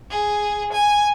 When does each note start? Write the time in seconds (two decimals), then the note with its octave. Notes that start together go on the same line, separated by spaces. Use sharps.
0.11 G#4
0.73 G#5